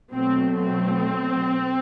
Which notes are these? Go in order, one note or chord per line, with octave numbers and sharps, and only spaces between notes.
B2 F#3 A3 C4
C4